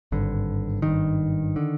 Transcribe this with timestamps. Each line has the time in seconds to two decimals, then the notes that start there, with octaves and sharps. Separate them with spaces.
0.12 G#1 G2 D3
0.82 D3 D#3
0.86 G#1 G2
1.56 D3